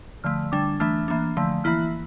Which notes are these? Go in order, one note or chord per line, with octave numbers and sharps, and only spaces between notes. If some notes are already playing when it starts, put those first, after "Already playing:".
D3 F3 A3 F6
D3 G3 D4 D6
E3 A3 D4 F6
E3 A#3 D4
D3 F3 A3
E3 A#3 E4 F6